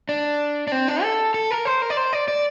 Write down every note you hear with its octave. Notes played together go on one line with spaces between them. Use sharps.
D4
D4
C4
D4
A4
A4
A#4
C5
A#4
D5
C5
D5
D5